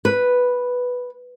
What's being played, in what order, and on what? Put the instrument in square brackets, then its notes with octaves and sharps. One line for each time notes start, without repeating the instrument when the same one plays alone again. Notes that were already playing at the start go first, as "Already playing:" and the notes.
[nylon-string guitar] B4